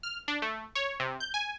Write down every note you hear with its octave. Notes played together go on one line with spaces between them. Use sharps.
F6
D4
A3
C#5
C3
G6
G#5